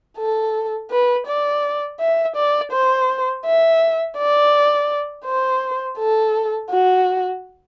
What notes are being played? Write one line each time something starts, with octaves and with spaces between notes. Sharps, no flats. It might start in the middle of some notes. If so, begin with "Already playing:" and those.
A4
B4
D5
E5
D5
C5
E5
D5
C5
A4
F#4